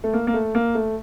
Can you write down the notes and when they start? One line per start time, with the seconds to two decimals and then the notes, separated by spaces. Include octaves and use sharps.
0.04 A3
0.14 A#3
0.27 A#3
0.34 A3
0.55 A#3
0.75 A3